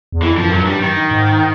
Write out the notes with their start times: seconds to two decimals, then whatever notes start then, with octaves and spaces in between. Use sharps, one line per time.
0.12 E2
0.22 F2 E3
0.38 F#2 F3
0.51 F#2 F#3
0.61 G2
0.67 G3
0.81 D#3
1.11 G#2